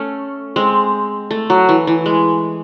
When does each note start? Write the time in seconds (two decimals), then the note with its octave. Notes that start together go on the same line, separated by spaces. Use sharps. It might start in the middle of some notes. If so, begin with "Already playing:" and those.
Already playing: A3 C#4
0.56 G#3 C4
1.31 A3
1.50 F#3
1.69 E3
1.87 E3
2.06 G#3